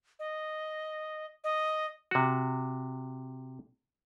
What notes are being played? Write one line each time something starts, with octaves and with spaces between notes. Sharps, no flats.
D#5
D#5
C3 F#4